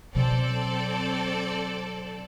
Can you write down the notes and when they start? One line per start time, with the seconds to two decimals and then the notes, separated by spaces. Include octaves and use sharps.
0.15 B2 F#3 C4 A4 D5